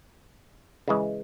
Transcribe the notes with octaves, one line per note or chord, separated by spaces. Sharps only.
C#3 E3 G#3